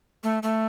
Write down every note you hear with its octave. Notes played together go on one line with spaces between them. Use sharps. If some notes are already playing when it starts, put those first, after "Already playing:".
A3
A3